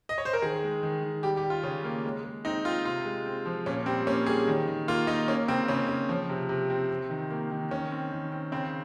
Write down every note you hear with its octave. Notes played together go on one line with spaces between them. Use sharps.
D#5
C#5
C5
A#4
D#3 G#4
G#3
D#3
D#3
G3 G4
G4
G3
F4
C#3 C#4
A#3
G#3
G#3
C4 D#4
C4 F4
C3 F4
G#3
C4
F3
A#2 C#4
G3 C4
A#3 C#4
G3 G#4
D#3
D#3
A#3 F4
A#3 D#4
A#3 C#4
C#3 C4
C#3 C#4
C#3
F3
C3
C3
C4
C3
D#3
A#3
D#3
D#3 C#4
C4
D#3
C4
C#3 C4